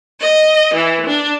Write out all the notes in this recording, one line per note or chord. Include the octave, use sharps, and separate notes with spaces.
D#5
E3
D4